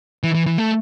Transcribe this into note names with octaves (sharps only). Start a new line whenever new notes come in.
E3
E3
E3
A3